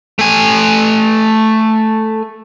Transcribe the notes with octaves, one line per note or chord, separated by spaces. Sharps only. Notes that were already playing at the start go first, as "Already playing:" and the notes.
A3 G#5